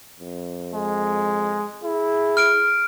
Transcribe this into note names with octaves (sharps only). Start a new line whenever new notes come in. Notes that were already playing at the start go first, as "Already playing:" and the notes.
F2
G#3
E4 G#4
F6 D7